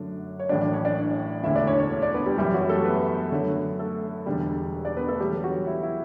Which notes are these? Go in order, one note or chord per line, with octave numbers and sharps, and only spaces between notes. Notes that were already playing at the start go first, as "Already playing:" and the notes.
Already playing: F#2 D3 F#3 A3 D4
C#5
A1 A2 F#3 D4 D5
D4 D5
C#4 C#5
D4 D5
E1 D2 D3 A3 E4 E5
D4 D5
C#4 C#5
C#4 C#5
D4 D5
B3 B4
G3 G4
F#2 E3 G3 G4
F#3 F#4
A3 A4
B3 B4
F#2 D3 F#3 A3
A3 A4
E1 E2 D3 G3
D4 D5
B3 B4
A3 A4
E2 D3 F#3 G3 G4
F#3 F#4
E4
E4